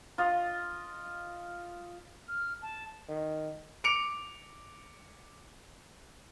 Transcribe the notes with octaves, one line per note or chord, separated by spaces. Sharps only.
F4 D#5
F6
A5
D#3
D6 C#7 D7 F7